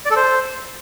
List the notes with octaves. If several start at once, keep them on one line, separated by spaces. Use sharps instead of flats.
D5
A4
C5